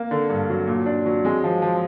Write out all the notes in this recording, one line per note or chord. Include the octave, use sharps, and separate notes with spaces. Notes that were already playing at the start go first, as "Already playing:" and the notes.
Already playing: A#3
D3
G2
F#3
A#2
D4
F#3
G#3
F3
F3